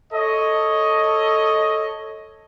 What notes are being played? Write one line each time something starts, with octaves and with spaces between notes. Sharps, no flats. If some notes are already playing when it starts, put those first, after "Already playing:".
A4 C#5 D#5